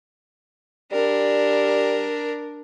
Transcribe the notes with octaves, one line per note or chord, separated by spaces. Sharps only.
G3 D4 A#4